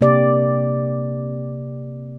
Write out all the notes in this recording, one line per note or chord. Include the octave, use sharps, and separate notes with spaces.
C3 A#3 G4 D5